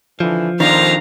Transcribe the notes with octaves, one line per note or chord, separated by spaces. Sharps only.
D3 E3 F3
A#1 F2 D#3 D4 C5 F5 A#5